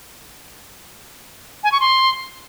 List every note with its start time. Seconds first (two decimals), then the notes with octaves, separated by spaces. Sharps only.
1.64 G#5
1.72 C#6
1.80 C6